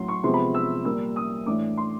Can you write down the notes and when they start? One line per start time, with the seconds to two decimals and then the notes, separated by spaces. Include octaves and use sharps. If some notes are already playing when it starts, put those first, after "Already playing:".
Already playing: A2 F#3 C#4 C6
0.08 C#6
0.24 C3 F3 G#3 B3 C6
0.34 B5
0.54 E6
0.85 A#2 G3 A#3 E6
1.16 D#6
1.46 A2 E3 A3 D4 D6
1.77 C6